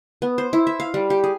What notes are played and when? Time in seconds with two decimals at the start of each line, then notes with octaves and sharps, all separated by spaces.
0.22 B3
0.38 C5
0.53 E4
0.67 E5
0.80 F5
0.94 G3
1.10 G4
1.24 G#4